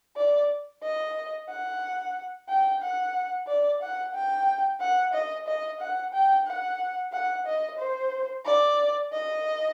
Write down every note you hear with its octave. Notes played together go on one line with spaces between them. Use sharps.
D5
D#5
F#5
G5
F#5
D5
F#5
G5
F#5
D#5
D#5
F#5
G5
F#5
F#5
D#5
C5
D5
D#5